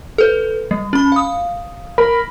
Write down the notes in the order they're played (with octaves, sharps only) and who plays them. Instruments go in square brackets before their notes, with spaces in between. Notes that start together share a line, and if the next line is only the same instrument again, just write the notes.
[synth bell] A4 B4
G3
C#4 B5
F5 D#6
[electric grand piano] A#4 B5